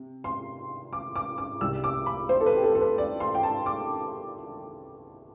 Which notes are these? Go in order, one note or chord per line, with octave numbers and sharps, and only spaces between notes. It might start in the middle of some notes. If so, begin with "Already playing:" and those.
Already playing: C3
C6
D6
D6
D6
C2 C3 G3 E6
D6
B5
C5
A4
B4
G4
A4
A4
B4
D5
C6
G5
A5
D6